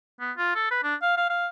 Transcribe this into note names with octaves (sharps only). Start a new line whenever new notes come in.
B3
F4
A4
B4
D4
F5
F5
F5